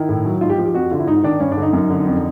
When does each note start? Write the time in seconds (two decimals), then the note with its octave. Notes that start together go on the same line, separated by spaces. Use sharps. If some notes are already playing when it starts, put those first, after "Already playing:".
Already playing: D#3 E4
0.09 A2
0.25 F#3
0.41 G#2 F4
0.49 G4
0.58 F3
0.66 G4
0.74 F2 F#4
0.91 D3 F4
1.00 E4
1.07 G#2 D#4
1.23 D#3 D4
1.40 G2 C#4
1.52 D4
1.57 D3
1.62 D#4
1.73 F#2
1.90 D3
2.06 F2